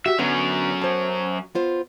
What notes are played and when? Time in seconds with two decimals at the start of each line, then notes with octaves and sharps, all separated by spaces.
0.06 F#4 G4 E5
0.19 D3 F#3 B3 C#4
0.82 C5 A5
1.55 B3 F4 C5